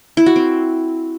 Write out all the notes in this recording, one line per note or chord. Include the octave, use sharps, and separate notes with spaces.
E4
F#4
C4